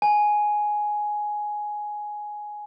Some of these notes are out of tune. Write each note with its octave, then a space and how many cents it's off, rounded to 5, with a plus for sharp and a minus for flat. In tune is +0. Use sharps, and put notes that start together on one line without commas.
G#5 +10